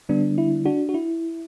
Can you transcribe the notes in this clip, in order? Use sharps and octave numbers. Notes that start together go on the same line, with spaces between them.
D3 G3 B3 D4
E4
D4 F#4
F#4
E4